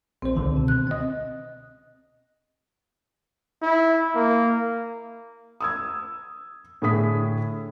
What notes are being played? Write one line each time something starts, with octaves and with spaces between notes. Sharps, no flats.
A#1 C4 C5
C#2 D3 D#3
B2
F#6
C4 D#5
E4
A#3
D#6 E6 G#6
A2 D3 G#4 D#6 B6